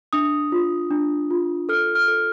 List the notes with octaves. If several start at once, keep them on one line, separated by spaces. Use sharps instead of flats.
D4 D#6
F4
D4
F4
A4 F6
F6
A4